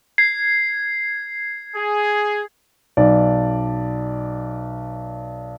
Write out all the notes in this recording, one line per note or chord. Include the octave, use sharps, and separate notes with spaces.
G#6 C7
G#4
B1 D5